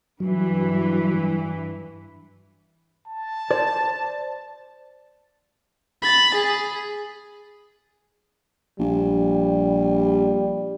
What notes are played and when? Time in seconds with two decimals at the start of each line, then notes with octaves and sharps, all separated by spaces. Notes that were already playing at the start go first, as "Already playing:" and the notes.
0.20 G2 E3 F#3
3.08 A5
3.51 C5 D5
6.02 B5 A6
6.35 G#4
8.80 A#1 G3